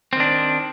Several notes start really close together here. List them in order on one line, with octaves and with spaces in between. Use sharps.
C4 D#3 D4